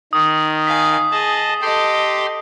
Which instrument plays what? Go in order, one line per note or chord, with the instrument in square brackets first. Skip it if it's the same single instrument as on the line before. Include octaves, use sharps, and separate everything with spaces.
[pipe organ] D#3 [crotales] D#6
[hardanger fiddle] F5 G#5 [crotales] B6
[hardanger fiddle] G#4 [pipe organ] D#5 A5
[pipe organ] G4 G5 C6 [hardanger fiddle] A4 D#5